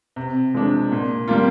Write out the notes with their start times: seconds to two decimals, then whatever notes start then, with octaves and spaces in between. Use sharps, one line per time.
0.16 C3
0.54 F3 G#3 D4
0.92 A#2
1.28 G3 A#3 F4